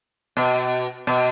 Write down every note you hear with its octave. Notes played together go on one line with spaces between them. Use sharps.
B2
B2